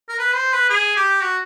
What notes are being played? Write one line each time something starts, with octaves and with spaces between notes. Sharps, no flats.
A#4
B4
C5
B4
G#4
G4
F#4